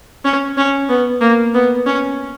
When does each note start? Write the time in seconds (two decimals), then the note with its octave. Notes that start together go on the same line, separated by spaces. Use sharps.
0.25 C#4
0.57 C#4
0.89 B3
1.21 A#3
1.54 B3
1.87 C#4